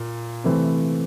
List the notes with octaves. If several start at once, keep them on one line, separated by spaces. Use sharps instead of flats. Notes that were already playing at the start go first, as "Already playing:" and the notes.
Already playing: A#2
C3 E3 A3 C4